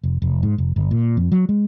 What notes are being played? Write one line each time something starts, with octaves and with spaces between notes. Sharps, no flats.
F1
F1
G#2
F1
G1
A#2
F2
F#3
G#3